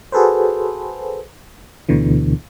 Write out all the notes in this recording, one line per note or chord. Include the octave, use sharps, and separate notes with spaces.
F#4 G#4 A4 B4 C5
D2 B2 D3 E3